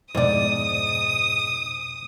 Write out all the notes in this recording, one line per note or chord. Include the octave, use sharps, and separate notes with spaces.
F2 G#2 B2 D5 D#6